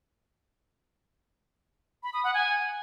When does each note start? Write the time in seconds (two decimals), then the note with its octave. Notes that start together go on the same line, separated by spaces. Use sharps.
2.03 B5
2.13 D#6
2.24 F#5
2.34 G#5